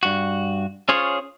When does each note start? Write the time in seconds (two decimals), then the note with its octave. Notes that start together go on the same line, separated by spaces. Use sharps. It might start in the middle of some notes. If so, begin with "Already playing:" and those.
0.03 G2 F#4
0.89 C#4 F4 G#4 C5 C#5